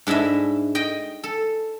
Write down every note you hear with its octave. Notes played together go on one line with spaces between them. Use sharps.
G#2 D4 E4 D#5 E5
D#5 G5
A4